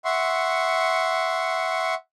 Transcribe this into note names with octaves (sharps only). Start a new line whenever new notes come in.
E5 F#5 C6 C#6